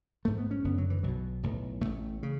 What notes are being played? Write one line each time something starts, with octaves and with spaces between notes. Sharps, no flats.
A1 G#2 A3
B3
C#4
F#1 F#2 D3 B3
F#3
E3
B1 B2 F#3
B1 A2
A1 A2 A3
C#3